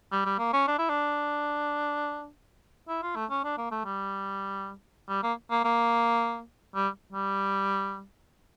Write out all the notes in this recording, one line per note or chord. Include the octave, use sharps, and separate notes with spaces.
G3
G3
A#3
C#4
D4
E4
D4
E4
F4
A3
C#4
D4
A#3
A3
G3
G3
A#3
A#3
A#3
G3
G3